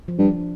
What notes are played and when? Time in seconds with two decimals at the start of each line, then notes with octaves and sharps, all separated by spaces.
0.08 F3
0.19 G2
0.28 D4